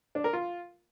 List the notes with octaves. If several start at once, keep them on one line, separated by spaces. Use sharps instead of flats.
D4
A#4
F4